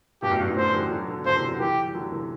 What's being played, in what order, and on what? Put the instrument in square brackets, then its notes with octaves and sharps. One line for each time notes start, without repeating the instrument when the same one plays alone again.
[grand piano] G2 B2 [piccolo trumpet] G4
[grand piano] F#2 A2
G2
F#2 A2
[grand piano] D3 F#3 [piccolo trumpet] C5
[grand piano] E3 G3
D3 F#3
B2 D3
[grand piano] G2 B2 [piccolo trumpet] C5
[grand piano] C3 E3
D3 F#3
[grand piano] E3 G3 [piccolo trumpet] G4
[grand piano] G3
D3 F#3
C3 E3